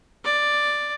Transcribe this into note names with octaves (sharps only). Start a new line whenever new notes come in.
D5